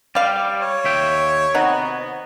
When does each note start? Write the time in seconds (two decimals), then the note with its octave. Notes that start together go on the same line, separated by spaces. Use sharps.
0.15 G3 G4 D5 F5
0.61 C#5
0.84 D#2 E5 G5
1.55 C3 B3 D#4 F#4